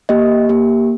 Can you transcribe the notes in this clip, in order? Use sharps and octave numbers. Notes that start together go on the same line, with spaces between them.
A#3 G4 D#5
A#3 G4